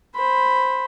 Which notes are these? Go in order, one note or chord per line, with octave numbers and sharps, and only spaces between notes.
C5 B5